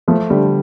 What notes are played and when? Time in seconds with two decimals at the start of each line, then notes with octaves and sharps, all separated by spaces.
0.08 F3 A3
0.30 D3 G3